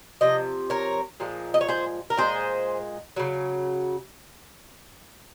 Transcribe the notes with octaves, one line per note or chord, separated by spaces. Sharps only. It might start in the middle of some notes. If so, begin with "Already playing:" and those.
C3 F3 D#5
A#4 C#5
A#2 F3 G#3
D#5
C#5
G#4 C5
A#4
A#2 G#3 G#4 C5
C#3 F#3